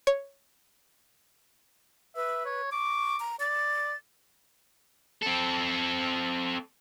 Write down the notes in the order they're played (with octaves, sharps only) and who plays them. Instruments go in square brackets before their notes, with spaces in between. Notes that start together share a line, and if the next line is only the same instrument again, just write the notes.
[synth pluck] C#5
[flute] B4 [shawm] E5
[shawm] C#5
[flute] C#6 [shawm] D6
[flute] A#5
[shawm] D5 [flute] A6
[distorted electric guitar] C4 A4